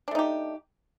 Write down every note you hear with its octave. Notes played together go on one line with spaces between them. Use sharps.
A3 D4 D#4 G4